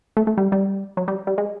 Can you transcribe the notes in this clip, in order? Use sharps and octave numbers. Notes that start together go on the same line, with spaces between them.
A3
A3
G3
G3
F#3
G3
G3
G#3